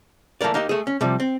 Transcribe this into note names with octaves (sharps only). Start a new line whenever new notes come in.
E3 A3 A#3 A#4 D5
A#3 D#4 G4 D#5
A3 G#4
C#4
C3 F3 G3
C4